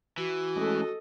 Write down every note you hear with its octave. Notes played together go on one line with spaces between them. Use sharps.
E3 F#4
G#3 A3 C#4 A4 D#5